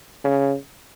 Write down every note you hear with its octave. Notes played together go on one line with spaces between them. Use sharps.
C#3